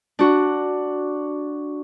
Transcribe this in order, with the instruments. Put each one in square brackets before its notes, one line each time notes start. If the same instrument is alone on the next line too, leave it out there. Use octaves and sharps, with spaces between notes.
[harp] D4 F#4